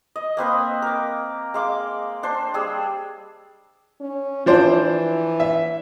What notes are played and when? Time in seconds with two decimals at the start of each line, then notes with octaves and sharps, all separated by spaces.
0.16 D#5
0.37 A#3 C4 B4 D#6
0.82 A#4 D6
1.54 G#3 F5 D6
2.23 D4 C5
2.54 G3 G#4 E6
4.01 C#4
4.46 E3 F3 D4 C5
5.40 E5